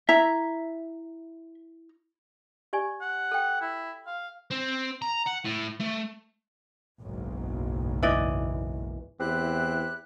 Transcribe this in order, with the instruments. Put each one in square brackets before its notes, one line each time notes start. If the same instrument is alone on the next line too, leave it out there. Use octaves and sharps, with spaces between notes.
[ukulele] E4 A#5 [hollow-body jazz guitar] E5
[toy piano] G4 D5 G#5
[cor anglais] F#5
[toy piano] A4 G5
[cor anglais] E4
F5
[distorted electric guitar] C4
A#5
F#5
A2
A3
[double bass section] F#1 B1 G#2
[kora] E3 D5 D#5
[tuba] E2 [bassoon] C4 [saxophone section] E4 G4 [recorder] F#6